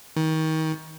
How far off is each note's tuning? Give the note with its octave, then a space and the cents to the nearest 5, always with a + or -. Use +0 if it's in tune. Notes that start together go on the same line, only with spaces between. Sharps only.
D#3 +30